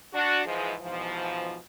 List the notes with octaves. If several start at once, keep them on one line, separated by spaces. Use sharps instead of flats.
D4 F#4
G#2 E3 F3 G#3
G#2 B2 E3 F3